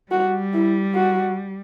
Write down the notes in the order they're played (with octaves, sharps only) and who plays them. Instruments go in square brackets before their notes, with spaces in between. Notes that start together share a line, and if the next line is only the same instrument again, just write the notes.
[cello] G3 [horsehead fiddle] F#4
[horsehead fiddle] E4
F#4